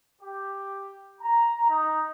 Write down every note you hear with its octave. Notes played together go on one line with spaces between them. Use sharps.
G4
A#5
D#4